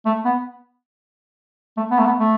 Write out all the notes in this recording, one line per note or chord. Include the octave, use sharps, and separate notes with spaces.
A3
B3
A3
B3
A3
B3
A3